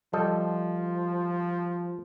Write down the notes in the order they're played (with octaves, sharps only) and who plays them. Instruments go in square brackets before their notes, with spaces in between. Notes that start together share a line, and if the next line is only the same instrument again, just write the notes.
[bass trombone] F3 [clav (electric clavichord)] G3 A4 D#5